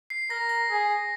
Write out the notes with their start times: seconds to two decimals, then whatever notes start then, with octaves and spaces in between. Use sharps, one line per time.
0.10 C7
0.30 A#4 A#6
0.49 A#6
0.70 G#4